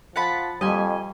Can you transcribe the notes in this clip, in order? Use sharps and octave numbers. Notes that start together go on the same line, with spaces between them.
F3 F#5 A5 B5
F2 G3 D#5 G#5